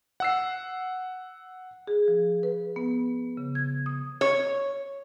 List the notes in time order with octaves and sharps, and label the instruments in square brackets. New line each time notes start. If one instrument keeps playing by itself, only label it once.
[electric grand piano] F#5 E6 C7
[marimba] G#4
F3
B4
B3
C#3
G#6
D#6
[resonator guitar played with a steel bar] C#5